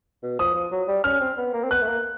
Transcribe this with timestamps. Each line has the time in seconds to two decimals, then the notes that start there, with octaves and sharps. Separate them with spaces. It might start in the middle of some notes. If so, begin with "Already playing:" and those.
0.23 B2
0.39 F3 D#6
0.55 F3
0.72 F#3
0.88 G3
1.04 C#4 F6
1.21 C4
1.38 B3
1.53 A#3
1.64 C4
1.71 B3 F#6
1.82 A3
1.87 A#3